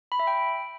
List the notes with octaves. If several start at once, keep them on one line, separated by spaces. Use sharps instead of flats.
B5
E5
G5